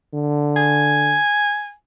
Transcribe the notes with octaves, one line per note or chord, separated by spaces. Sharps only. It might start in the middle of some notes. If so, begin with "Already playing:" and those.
D3
G#5